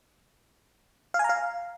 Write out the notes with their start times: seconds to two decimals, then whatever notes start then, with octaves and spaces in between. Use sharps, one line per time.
1.14 F5
1.19 G#5
1.24 A#5
1.29 F5